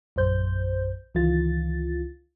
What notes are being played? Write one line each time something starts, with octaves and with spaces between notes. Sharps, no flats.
A#1 F#2 C5 G6
C#2 D#3 E3 F4 A6